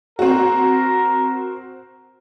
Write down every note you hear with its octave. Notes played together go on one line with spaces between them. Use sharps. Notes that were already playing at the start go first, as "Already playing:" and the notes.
C4 F#4 A#4